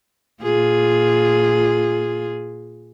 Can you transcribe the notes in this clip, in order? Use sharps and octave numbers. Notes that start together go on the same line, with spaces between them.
A#2 F4 G#4